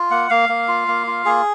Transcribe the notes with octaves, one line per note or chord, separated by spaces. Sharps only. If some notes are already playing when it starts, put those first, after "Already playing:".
Already playing: F4
A#3 F#5
A#3 F5
A#3
F4
A#3
F4
A#3 G#4